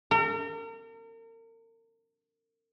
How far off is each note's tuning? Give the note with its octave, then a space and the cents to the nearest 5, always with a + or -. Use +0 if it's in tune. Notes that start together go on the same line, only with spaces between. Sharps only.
A#4 -40